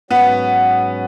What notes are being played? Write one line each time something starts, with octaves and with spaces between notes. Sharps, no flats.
G#2 F#3 B3 C#4 F#4